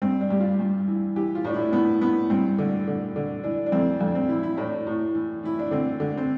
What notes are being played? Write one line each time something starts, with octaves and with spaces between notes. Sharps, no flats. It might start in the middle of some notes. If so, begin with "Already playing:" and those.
G2 C4
D4
G2 G4
F4
G2
E3
E3 G4
F4
A2 D4
E4
E3 B3
E3 B3
G2 C4
D3
D3
D3
E3 D4
D4
F2 C4
F2 D4
C4
E3 E4
E4
A2 D4
A2
E3
E3 E4
D4
D3 C4
D3
C4